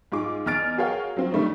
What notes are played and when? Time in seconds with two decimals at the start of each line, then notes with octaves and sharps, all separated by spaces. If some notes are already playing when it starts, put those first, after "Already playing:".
0.12 G#2 F4 G#4 D6
0.46 E2 D#5 F6 A6 D7
0.78 F#4 G#4 A#4 C#5 F5 G5
1.16 F#3 C4 F4
1.32 D#3 G3 A3 D4 D#4